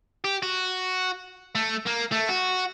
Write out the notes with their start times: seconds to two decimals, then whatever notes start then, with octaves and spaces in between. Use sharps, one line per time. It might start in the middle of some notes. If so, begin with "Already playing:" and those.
0.24 G4
0.43 F#4
1.55 A3
1.87 A#3
2.12 A3
2.29 F#4